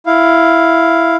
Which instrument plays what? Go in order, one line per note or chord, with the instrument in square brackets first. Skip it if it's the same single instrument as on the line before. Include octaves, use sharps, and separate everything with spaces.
[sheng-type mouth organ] E4 F5